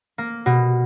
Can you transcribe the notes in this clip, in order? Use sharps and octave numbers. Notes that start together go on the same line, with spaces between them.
A#3
B2